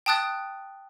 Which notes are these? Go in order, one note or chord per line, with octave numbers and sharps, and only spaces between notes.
G5 A5 D#6 F#6 A6